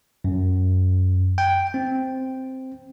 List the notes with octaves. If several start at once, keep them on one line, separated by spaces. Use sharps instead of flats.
F#2
G5
C4